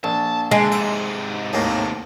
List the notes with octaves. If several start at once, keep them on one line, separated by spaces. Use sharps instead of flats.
A#1 A5
D3 G#3
G#2 C3 E5
D#2 A2 A#3